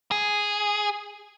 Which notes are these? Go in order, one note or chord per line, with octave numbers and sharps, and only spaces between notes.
G#4